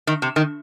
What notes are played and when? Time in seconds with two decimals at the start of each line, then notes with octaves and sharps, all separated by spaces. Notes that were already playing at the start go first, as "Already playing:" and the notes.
0.07 D#3
0.22 C3
0.36 D#3